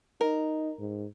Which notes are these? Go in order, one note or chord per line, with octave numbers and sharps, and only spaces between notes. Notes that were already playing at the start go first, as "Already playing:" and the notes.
D#4 A#4
G#2